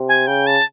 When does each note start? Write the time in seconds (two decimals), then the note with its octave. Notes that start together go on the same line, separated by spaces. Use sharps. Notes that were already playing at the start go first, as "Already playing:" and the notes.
Already playing: C3
0.08 G#5
0.27 C#3 G5
0.47 A5